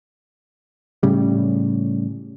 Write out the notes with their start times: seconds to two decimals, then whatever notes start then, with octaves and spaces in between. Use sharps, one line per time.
1.03 A2 C#3 G3